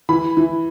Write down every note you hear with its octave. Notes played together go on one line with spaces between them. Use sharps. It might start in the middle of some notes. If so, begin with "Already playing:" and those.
E3 B5
E3